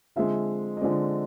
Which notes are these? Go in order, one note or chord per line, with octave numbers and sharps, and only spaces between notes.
D3 F3 G#3 C4 E5
D#5
D3 F3 G#3 C4 D5